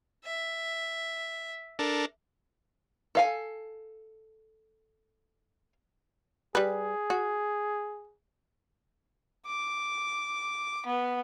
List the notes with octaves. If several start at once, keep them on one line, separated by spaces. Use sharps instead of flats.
E5
D4 A4 A#4
A4 F5 G#5
G3 G#4 B4
F#4
D6
B3